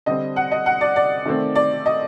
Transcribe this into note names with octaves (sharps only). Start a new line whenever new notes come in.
D3 G3 C4 D#5
F#5
D#5
F#5
D5
D5
D#3 A3 C4
D5
D#5